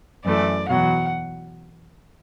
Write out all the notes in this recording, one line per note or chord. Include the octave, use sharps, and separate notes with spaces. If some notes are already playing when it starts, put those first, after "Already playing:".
F#2 E3 A3 D5
E2 B2 F#3 F#5